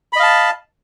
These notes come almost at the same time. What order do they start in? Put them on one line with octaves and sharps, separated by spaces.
B5 D#5 F5 A5